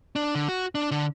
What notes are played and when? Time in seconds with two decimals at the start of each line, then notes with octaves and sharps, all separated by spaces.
0.16 D4
0.35 D3
0.49 F#4
0.75 D4
0.91 D3